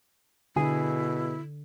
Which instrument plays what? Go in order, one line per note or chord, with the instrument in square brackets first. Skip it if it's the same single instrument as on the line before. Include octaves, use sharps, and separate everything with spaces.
[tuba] B2 [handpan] D3 [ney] E4 [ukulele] G#4